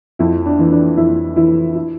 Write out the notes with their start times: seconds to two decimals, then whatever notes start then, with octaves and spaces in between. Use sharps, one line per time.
0.19 F2 E4
0.46 D4
0.59 E3
0.72 D4
0.97 F2 E4
1.36 E3 E4
1.75 E4